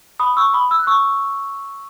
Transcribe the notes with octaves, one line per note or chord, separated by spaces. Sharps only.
B5 D#6
C#6 E6
B5 D#6
E6
F#6
C#6 E6